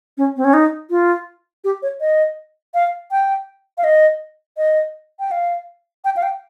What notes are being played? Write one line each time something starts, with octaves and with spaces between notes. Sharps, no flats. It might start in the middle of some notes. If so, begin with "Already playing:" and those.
C#4
C4
C#4
D#4
F4
G4
C#5
D#5
F5
G5
F5
D#5
D#5
G5
F5
G5
F5
G5